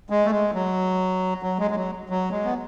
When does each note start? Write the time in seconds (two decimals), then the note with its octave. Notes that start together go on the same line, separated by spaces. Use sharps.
0.10 G#3
0.25 A3
0.31 G#3
0.54 F#3
1.43 F#3
1.59 G#3
1.71 G#3
1.76 F#3
2.09 F#3
2.32 G#3
2.45 B3